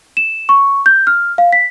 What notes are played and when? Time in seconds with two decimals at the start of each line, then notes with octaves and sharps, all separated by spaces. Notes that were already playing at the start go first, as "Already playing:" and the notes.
0.17 E7
0.49 C#6
0.86 G6
1.07 F6
1.38 F5
1.53 B6